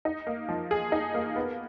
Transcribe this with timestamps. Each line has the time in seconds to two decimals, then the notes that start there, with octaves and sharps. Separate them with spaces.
0.05 D#4
0.27 A#3
0.49 F3
0.71 G#4
0.92 D#4
1.14 A#3
1.36 B3